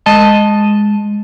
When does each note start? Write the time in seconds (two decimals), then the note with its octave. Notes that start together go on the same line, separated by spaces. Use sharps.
0.06 G#3 D#5 A5